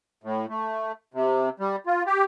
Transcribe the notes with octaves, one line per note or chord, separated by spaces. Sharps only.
A2
A3
C3
G3
F4
G4